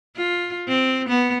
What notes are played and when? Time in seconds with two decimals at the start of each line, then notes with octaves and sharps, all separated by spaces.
0.16 F4
0.68 C4
1.09 B3